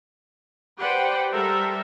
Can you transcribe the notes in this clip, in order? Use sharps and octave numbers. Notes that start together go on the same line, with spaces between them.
G4 B4 C5 D5 F#5 G5
G3 A4 A#4 C5 E5